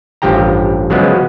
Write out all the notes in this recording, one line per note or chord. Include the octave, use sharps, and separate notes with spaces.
A1 G2 F3 G4 G5 A#5
C#3 F3 F#3 G#3 B3